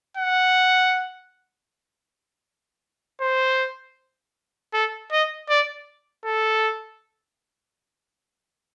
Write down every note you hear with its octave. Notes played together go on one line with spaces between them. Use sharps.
F#5
C5
A4
D#5
D5
A4